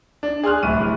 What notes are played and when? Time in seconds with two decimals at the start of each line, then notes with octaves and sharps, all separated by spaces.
0.23 D4
0.43 G#4 C6 F6 F#6
0.63 D1 C2 A2 B5 D#7